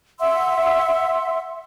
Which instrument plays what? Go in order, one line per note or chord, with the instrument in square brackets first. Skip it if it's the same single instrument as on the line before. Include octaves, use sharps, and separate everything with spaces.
[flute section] E5 F#5 C6 E6